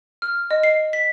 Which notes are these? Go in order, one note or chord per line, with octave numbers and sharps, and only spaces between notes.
F6
D#5
C7
B6